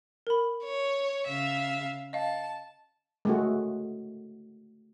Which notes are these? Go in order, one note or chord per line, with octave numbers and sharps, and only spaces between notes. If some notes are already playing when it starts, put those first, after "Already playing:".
A#4 B5
C#5
C#3 E5 F5
D#5 F5 A5
G#3 A3 F#4